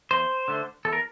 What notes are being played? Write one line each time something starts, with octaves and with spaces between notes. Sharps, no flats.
E2 C5
D3 A3
E2 A4
A#4